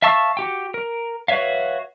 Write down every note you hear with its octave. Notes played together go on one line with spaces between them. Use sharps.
E5 F5 A5 C#6 E6
F#4 G4 G5
A#4
F#4 B4 C#5 E5 F5